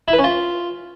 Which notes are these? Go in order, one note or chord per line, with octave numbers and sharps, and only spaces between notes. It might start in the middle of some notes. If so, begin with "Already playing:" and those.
E4
B4
C#4
F4